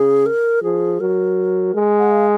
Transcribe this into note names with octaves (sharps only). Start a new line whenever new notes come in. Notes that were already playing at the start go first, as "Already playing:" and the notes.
Already playing: C#3 G#4
A#4
F3 G#4
F#3 A#4
G#3
F#5
F5